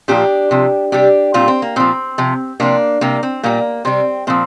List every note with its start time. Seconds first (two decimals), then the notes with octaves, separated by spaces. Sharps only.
0.08 A#2 F3 D4 G4
0.51 C3 F3
0.92 C3 G3 D4 G4
1.34 A#2 G3 C4 F4
1.48 C4
1.62 A#3
1.76 A#2 F3 C4
2.18 C3 F3
2.60 C3 F3 A#3 D4
3.01 C3 G3 A#3
3.23 C4
3.43 A#2 G3 A#3
3.85 C3 G3 C4
4.27 A#2 F3 C4